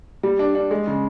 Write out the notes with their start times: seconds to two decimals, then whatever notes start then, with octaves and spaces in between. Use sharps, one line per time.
0.23 G3
0.39 D4
0.55 D4
0.71 G#3
0.87 C#3